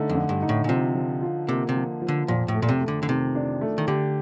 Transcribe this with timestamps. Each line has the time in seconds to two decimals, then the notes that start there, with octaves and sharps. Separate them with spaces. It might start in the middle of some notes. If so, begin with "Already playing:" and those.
Already playing: D3 A3 D#4
0.09 F2
0.15 D3
0.29 G2
0.42 D#4
0.49 A2
0.64 A#2
0.69 C3 F3
0.95 F3
1.22 F4
1.48 C3 A#3
1.69 C3
1.76 F3
2.02 F3
2.08 D3
2.28 F2 A#2
2.48 A2
2.54 A3
2.62 A#2
2.69 C3
2.81 A3
2.88 D3
3.03 D3
3.08 C3 D#3
3.35 D4
3.61 A3
3.78 D#3
3.87 D3 G4